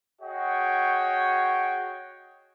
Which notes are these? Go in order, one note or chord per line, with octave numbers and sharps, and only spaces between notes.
F#4 G#4 C#5 D#5 G5